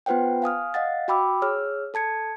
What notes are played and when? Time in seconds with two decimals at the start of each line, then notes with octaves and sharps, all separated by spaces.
0.06 B3 F4 B4 C5 F#5 G5
0.42 F5 G#5 D#6 F6
0.74 D#5 F5 F#5 A6
1.08 F#4 G5 B5 D6 E6
1.42 G#4 C#5 E6 F6
1.94 A4 A5 G#6 C#7